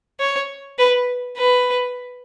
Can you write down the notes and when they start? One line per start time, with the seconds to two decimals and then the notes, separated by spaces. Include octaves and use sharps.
0.20 C#5
0.79 B4
1.38 B4